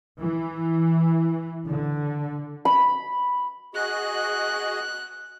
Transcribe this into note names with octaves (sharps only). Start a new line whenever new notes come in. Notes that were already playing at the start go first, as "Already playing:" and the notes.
E3
D3
B5
F#4 G#4 D#5 F#6